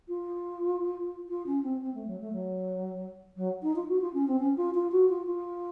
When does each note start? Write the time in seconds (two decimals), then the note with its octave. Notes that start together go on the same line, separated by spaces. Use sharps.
0.08 F4
1.29 F4
1.46 C#4
1.63 C4
1.81 C4
1.94 A3
2.07 F#3
2.20 A3
2.33 F#3
3.36 F#3
3.63 D#4
3.76 F4
3.88 F#4
4.01 F4
4.14 C#4
4.28 C4
4.40 C#4
4.57 F4
4.74 F4
4.92 F#4
5.09 F4
5.26 F4